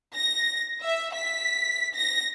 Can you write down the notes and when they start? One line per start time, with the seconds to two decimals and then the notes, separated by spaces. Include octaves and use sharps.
0.14 A#6
0.82 E5
1.14 B6
1.95 A#6